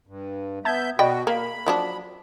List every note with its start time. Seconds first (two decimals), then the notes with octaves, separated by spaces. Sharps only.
0.07 G2
0.65 B3 E5 A5 G6 G#6
0.99 B2 F#4 D5 D#5 G5 B5
1.27 A#3 F5 B5
1.66 F3 F#3 D4